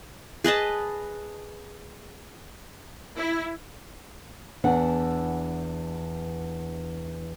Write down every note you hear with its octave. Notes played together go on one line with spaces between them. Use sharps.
G#4 B4 D#5 A5
E4
E2 D4 B4 F#5